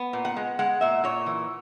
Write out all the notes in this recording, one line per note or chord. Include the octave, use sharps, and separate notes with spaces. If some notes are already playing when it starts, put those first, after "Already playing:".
Already playing: B3
A#2
F#5
G#3
G#3 F#5
A#2 E5
A#2 C#5
E3